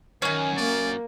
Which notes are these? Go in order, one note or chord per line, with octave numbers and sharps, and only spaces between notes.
F#2 D#3 C#4 G#5
A#3 D5